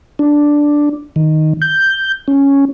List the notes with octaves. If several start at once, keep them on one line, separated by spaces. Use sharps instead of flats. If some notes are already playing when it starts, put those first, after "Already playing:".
D4
D#3
G6
C#4